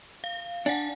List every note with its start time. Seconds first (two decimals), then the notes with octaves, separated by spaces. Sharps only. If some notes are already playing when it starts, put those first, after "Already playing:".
0.24 F5
0.66 D4 F#5 G#5